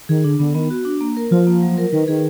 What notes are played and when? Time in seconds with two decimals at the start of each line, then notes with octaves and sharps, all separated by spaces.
0.09 D#3 G#4
0.24 D3 D4
0.39 D3 B3
0.55 D#3 B3
0.70 F#4
0.85 D4
1.01 A#3
1.17 A#4
1.31 F3 F4
1.47 A#3
1.62 F#3
1.78 A#4
1.92 D#3 B4
2.08 D#3 G#4